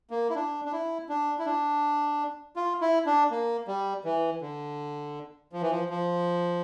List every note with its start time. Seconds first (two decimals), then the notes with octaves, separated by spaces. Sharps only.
0.11 A#3
0.30 E4
0.35 D4
0.65 D4
0.72 E4
1.09 D4
1.39 E4
1.46 D4
2.56 F4
2.81 E4
3.06 D4
3.31 A#3
3.68 G3
4.04 E3
4.42 D3
5.53 F3
5.62 E3
5.71 F3
5.90 F3